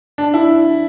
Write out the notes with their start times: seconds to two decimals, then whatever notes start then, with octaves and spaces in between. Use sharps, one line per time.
0.18 D4
0.34 E4